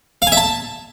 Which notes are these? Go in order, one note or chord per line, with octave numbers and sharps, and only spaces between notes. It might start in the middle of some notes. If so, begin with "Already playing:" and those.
F5
G#5
E5
A5